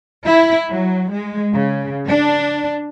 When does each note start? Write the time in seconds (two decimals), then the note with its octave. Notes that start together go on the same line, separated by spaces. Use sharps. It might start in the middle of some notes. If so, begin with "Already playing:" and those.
0.23 E4
0.69 F#3
1.11 G#3
1.52 C#3
2.07 D4